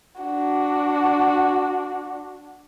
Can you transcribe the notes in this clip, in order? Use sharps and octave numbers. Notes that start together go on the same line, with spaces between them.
D4 F#4